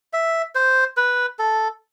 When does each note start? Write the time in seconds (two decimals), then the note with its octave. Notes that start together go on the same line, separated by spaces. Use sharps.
0.13 E5
0.55 C5
0.97 B4
1.39 A4